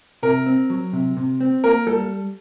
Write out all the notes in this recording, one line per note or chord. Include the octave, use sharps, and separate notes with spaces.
C3 A#4
C4
F#3
C3
C3
C4
A#3 A#4
G3 A4